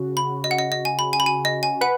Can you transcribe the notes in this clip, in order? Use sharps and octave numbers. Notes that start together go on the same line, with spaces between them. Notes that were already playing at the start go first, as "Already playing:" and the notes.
Already playing: C#3 F#4
B5
D#5
F#5
D#5
D#5
G#5
B5
G#5
B5
G#5
D#5
G#5
B4 F#5